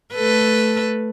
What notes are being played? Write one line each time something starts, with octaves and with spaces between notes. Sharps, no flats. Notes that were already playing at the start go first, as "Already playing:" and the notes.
A3 A4 B4